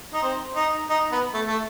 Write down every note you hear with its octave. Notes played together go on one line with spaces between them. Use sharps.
D#4
C4
D#4
D#4
B3
A3
A3